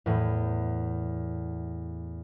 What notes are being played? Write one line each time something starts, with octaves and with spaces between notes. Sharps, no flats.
E2 A2